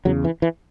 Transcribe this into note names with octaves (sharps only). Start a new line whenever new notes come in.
E2 C#3 F#3
E3
E3